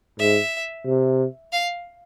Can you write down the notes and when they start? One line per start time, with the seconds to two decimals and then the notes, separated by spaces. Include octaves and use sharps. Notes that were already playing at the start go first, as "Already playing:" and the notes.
0.19 G#2 E5
0.86 C3
1.52 F5